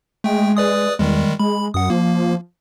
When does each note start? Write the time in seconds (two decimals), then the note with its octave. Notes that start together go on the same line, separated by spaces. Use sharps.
0.24 G#3 A3 G5
0.57 B4 D5 D#6
0.99 E2 D#3 G3 G#3
1.40 G#3 B5
1.74 F#2 F#5 D#6
1.90 F3 A#3